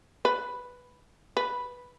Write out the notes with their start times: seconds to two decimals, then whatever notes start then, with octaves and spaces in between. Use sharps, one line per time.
0.25 B4
1.37 B4